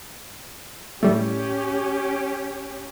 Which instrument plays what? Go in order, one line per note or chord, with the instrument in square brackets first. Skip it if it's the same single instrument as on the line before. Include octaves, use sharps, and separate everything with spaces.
[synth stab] A2 G3 A3 [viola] C#4 G4